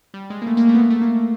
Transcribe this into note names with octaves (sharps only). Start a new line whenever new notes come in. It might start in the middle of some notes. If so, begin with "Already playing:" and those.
G3
G#3
A#3
A3
A#3
A3
B3
A#3
A3
A#3